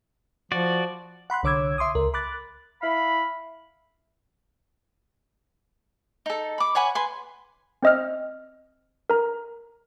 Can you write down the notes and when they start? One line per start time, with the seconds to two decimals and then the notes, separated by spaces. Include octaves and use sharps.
0.52 F3 F#4 D5
1.30 F#5 B5 C6 F#6
1.43 C2 D3 C#5 D6 E6 G#6
1.78 E5 C6 D6 D#6
1.95 C#2 A#4
2.14 B5 D6 F#6 A6
2.82 E4 F5 B5
6.26 D#4 A4
6.58 B5 D6
6.75 C#5 F#5 G#5 B5
6.95 B4 G#5 C6
7.83 C4 C5 D#5 E6 F6
9.10 A#4 A#5